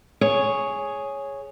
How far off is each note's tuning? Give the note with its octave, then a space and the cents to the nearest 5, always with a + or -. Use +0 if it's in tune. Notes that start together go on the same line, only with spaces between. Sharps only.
G#4 +0 C#5 +0